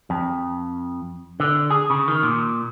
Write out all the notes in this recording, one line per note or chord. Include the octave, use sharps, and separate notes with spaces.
F2
D3
G#4
C#3
D#3
A#2